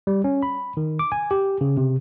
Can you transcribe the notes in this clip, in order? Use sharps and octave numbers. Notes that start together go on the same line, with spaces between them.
G3
C#4
B5
D#3
D6
G#5
G4
C#3
C3